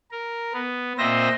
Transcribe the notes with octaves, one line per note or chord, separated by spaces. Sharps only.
A#4
B3
A#2 C4 C5 D#5 E5 A#6